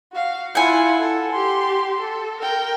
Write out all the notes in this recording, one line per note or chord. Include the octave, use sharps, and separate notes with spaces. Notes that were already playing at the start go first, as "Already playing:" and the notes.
F#4 F5
E4 F4 F#5 G#5
A4
G4 C6
A4
A#4 G5